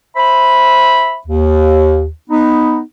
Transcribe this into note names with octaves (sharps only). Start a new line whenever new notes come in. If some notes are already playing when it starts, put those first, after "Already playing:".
C5 E5 B5
D#2
B3 D#4